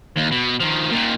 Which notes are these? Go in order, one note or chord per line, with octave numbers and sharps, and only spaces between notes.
D#2
B2
D#3 F3
A#2 D#3